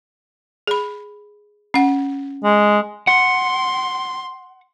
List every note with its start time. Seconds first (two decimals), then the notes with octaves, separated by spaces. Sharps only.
0.67 G#4 B5
1.74 C#4 F#5
2.44 G#3
3.07 F#5 C6